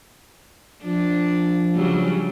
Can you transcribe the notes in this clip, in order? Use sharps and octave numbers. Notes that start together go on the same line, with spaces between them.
F3 D4
C#3 F#3 G3